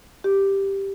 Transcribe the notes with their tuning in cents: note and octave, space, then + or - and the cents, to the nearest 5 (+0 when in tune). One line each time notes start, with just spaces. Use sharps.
G4 +0